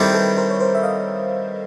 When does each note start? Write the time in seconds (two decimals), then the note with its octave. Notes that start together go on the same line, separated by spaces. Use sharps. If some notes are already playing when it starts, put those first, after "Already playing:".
Already playing: D#3 G3 C4 E4 G4 A4
0.14 A4 B4
0.37 A#4 C5
0.50 C#5
0.60 A#4 C5
0.75 E5
0.83 D#5 F5